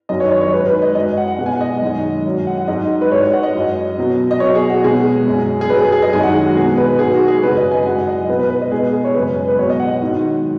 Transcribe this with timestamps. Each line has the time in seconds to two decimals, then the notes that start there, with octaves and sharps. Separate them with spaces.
0.09 F#2 D#3 F#3 D#5
0.20 C#5
0.31 C#5
0.41 C#5
0.53 G#2 G#3 B4
0.67 B4
0.82 D#5
0.95 F#2 F#3 D#5
1.17 F#5
1.28 F#5
1.38 B2 G#3 F#5
1.46 G#5
1.53 F#5
1.61 D#5
1.82 F#2 D#3 G#3
2.25 F#2 F#3
2.47 F#5
2.58 F#5
2.68 G#2 F#3 D#5
3.01 B4
3.11 G#2 G#3 C#5
3.23 C#5
3.33 F#5
3.43 D#5
3.55 F#2 F#3
3.98 B2 F#3
4.31 D#5
4.40 B2 F#3 C#5
4.55 G#4
4.70 F#4
4.84 B2 G#3 G#4
5.27 F#2 F#3
5.61 G#4
5.70 F#2 F#3 B4
5.81 G#4
5.92 G#4
6.02 D#5
6.13 F#2 D#3 G#3 G#5
6.23 F#5
6.46 F#4
6.56 B2 F#3 G#4
6.78 B4
6.99 G#2 F#3 G#4
7.14 F#4
7.28 G#4
7.43 F#2 C#3 G#3 B4
7.57 D#5
7.71 G#5
7.85 F#2 F#3 F#5
7.99 F#5
8.07 D#5
8.29 B2 G#3 B4
8.39 B4
8.50 B4
8.61 D#5
8.71 B2 G#3 G#4
8.94 G#4
9.05 C#5
9.15 F#2 C#3 G#3 B4
9.48 B4
9.58 B2 F#3 C#5
9.69 D#5
9.80 F#5
9.90 F#5
10.01 G#2 D#3 F#3